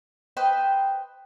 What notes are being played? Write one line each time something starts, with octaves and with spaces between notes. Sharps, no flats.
B4 C5 D#5 G5